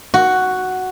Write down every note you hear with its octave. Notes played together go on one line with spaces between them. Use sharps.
F#4